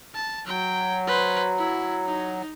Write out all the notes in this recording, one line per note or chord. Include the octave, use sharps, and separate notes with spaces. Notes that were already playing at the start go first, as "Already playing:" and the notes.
A5
F#3 G5
B4 C5
E4
D#4